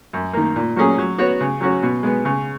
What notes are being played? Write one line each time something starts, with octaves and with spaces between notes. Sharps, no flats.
F#2
D#3 A#3
A#2
F#3 A#3 C#4 G#4
F#3
B3 F#4 C#5
C#3
F#3 C#4 F#4
B2
G#3 B3
C#3